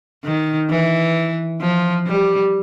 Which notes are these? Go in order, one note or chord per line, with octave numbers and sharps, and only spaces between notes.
D#3
E3
F3
G3